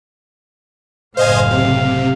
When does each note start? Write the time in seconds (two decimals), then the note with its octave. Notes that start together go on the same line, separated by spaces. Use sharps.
1.17 F#1 A2 C5 D#5 F5 G#5
1.51 C3